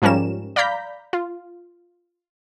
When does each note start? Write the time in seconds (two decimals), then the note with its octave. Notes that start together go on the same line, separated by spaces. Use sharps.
0.02 G#2 F3 G3 C#4 A#4 E7
0.56 D5 F5 A#5 B5 G6 B6
1.13 F4